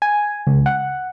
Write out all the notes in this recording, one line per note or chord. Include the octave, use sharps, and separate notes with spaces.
G#5
C#2
F#5